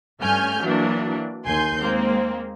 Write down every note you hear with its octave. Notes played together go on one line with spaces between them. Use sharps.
G2 A3 C#4 G#5 F6 G6
E3 F#3 A#3 D4
D#2 G#5 C6 G6
G#3 A#3 C4